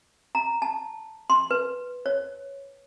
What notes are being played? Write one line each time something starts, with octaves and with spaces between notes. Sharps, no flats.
A#5
A5
C6
B4
C#5